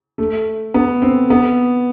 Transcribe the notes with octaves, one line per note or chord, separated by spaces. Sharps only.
A3
B3
C4
B3